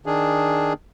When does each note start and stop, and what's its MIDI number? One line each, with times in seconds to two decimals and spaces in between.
0.06 0.73 51
0.06 0.73 62
0.06 0.73 68